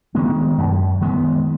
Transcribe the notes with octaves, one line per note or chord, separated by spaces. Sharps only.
D#3 G#3 B3
F#2
D#3 G#3 B3